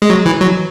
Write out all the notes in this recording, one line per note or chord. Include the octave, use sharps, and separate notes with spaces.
G#3
F#3
E3
F#3